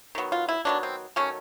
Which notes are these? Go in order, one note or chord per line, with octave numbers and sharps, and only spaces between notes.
D#3 F#3 B3
F4
E4
D#3 F#3 B3 D4
C4
D#3 F#3 A3 C#4